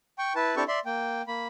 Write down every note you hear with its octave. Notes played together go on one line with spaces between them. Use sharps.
G5 C#6
E4 B4 A5
C4 D4 E4 G4 A4 C#6
D5 E5 C6
A#3 G5
A#3 B5